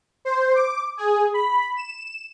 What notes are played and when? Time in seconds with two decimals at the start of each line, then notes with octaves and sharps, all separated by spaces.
0.25 C5
0.55 D6
0.97 G#4
1.34 B5
1.77 E7